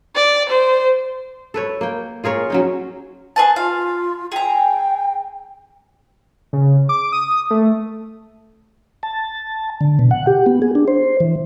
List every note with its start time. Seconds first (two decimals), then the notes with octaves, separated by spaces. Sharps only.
0.15 D5
0.49 C5
1.54 A4 B4 C#5
1.81 A#3 G5
2.24 F4 G#4 A#4 C#5
2.50 F#3 C#4 D#4
3.36 G#4 B4 A5
3.56 F4 F5
4.32 G#4 G5 A#5
6.53 C#3
6.89 D6
7.12 D#6
7.51 A3
9.03 A5
9.81 D3
9.99 B2
10.11 F#5
10.27 G4
10.46 B3
10.62 G#4
10.75 D4
10.88 C5
11.20 E3